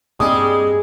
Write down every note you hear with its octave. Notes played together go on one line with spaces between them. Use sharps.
G2 G3 G#3 A#3 C4 D#6